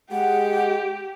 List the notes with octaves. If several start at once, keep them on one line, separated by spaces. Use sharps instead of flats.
G#3 G4 F#5